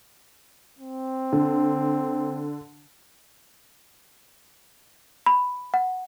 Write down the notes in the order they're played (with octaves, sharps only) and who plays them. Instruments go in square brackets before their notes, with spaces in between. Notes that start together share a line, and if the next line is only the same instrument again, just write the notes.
[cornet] C4
[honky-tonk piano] D3
[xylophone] B5
F#5